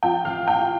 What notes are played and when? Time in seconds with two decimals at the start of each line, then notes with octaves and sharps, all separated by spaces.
0.03 F3 G5 G6
0.25 A1 F5 F6
0.47 A2 G5 G6